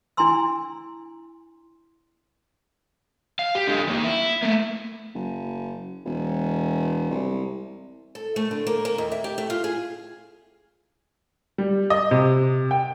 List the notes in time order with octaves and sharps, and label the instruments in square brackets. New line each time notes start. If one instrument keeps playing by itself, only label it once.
[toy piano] D4 E4 G#5 A#5 C6 E6
[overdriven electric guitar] F5
G4
D3 G#3
D#3 A#3
E4
A3 A#3
[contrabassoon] F#1
E1
C2
[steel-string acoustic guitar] A4
A3
D3
A#3
A#3
D#2
E5
G4
A3
F4
G#4
[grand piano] G3
D#5
C3
G5